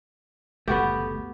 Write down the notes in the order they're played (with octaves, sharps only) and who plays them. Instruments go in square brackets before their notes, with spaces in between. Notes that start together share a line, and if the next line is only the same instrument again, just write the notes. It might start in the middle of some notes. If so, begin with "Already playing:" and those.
[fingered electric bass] F#1 D2 G3 [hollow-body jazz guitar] A3 [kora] B3 F#4 G4